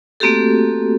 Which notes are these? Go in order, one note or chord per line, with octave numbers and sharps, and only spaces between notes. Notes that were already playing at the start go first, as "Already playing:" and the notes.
A3 A#3 C4 F#4 G4 A4